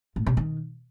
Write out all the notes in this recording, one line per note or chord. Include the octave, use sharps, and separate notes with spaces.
A2
C3
D#3